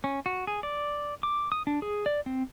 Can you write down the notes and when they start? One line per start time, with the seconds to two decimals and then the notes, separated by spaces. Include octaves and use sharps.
0.04 C#4
0.26 F#4
0.47 G#4
0.63 D5
1.23 D6
1.52 D#6
1.67 D4
1.82 G#4
2.06 D5
2.26 C4